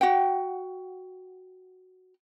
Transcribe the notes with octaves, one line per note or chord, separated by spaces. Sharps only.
F#4 F#5 G5